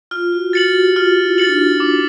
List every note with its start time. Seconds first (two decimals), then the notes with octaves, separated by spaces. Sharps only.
0.11 F4 F6
0.32 F#4
0.53 F#4 A6 C#7 F#7
0.68 F#4
0.75 G4
0.95 F4 F6
1.24 E4
1.38 A6 C#7 F#7
1.46 D4
1.53 D#4
1.80 D6